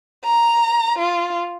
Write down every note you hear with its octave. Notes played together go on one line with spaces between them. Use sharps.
A#5
F4